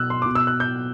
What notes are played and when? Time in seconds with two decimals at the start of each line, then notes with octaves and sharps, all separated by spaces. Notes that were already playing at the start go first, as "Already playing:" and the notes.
Already playing: B2 E6 F#6
0.10 C6
0.22 B2 D6
0.35 E6
0.47 F#6
0.60 G6